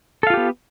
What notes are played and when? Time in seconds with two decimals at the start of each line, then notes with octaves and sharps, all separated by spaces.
0.23 A4
0.27 F5
0.30 F4
0.34 G4
0.37 B3